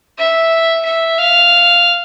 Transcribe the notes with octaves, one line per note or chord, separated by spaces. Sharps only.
E5
E5
F5